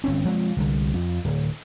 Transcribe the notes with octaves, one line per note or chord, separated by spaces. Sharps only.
G1 C4 C#4
F3 G#3 C4
C2 D3
F2
D1